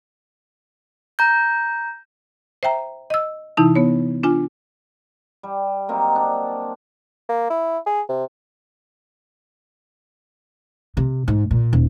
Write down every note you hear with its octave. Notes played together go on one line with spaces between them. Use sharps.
A#5 G6
C5 E5 G5 A#5
D#5 E6
C3 E3 D#4 E4 A5
B3 C#5
D4 F4 G#5
G3
F#3 A#3 C4 D#4
D4
A#3
E4
G#4
C3
C3
G#2
A#2
D#1